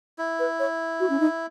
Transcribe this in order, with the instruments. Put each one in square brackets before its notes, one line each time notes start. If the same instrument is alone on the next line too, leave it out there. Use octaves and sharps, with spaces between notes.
[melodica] E4
[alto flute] B4
C#5
F#4
C#4
D#4